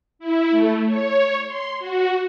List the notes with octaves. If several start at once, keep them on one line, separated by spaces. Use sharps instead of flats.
E4
A3
C#5
C6
F#4